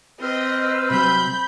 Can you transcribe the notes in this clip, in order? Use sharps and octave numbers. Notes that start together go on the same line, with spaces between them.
C4 B4 D#5 E6 F6
C3 F#3 B5 G6